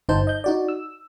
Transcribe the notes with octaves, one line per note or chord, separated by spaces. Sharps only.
G1 D#4 C5 A5 G6
D#5 G6
D#4 F#4 D5
E6